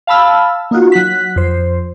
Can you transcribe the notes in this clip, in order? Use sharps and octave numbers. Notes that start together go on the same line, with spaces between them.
F5 A5 B5 E6 F6
A#3 D#4 F4 F#4
F#3 F#6 B6
F2 C5